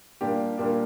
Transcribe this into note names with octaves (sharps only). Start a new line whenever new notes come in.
A#2 G3 A#3 D4 G4
A#2 G3 A#3 D4 G4